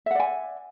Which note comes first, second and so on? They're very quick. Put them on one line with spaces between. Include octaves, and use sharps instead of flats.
E5 F#5 D5 G#5